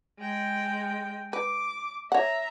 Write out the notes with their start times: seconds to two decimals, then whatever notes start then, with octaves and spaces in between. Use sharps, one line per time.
0.18 G#3 G5
1.33 B4 D6
2.12 C#5 E5 F#5 A#5